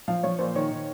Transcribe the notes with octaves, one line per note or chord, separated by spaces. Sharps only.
F3 F5
F3 C#5
A#2 C5
D#3 C#5
D#3